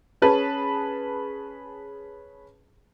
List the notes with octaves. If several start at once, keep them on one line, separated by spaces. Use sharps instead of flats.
C#4 G#4 B4 A5